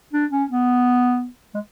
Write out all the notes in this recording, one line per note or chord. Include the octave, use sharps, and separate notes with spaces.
D4
C#4
B3
G#3